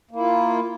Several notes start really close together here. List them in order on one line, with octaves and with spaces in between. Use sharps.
A#3 E4 F4